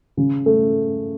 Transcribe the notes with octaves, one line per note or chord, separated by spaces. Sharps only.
C#3
A3